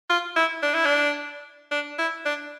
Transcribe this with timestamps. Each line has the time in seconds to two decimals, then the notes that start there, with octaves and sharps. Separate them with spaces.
0.10 F4
0.36 E4
0.63 D4
0.74 E4
0.85 D4
1.72 D4
1.99 E4
2.25 D4